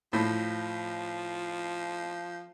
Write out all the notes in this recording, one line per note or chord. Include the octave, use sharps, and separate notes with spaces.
A2 F3